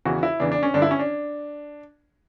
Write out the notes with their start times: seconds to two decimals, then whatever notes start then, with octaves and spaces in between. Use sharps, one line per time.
0.05 E2 C#3 E3 F#4
0.23 E4
0.40 E2 C#3 E3 D4
0.52 D4
0.63 C#4
0.74 G2 D3 D4
0.82 E4
0.91 C#4
0.99 D4